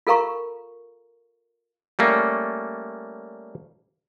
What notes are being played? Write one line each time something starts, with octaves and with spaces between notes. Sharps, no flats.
F4 A4 A#4 F5 A#5 C#6
G3 A3 A#3 C#4